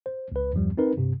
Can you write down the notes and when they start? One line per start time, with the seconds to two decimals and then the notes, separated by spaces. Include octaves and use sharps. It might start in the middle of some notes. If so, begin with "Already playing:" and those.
0.06 C5
0.32 C#2 B4
0.53 E2 G2 F3 G3
0.78 C4 D#4 A#4 B4
0.97 G2 C3